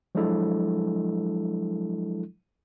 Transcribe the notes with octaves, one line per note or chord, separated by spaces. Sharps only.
F3 F#3 G#3 D4 E4 A4